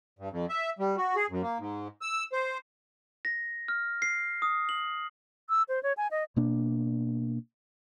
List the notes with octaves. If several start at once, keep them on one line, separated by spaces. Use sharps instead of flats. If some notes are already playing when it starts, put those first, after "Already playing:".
G2
F2
E5
G3
F#4
G#4
F#2
A#3
G#2
E6
C5
A#6
F6
C7
D#6
F#7
E6
C5
C#5
G#5
D#5
B2 A#3 D4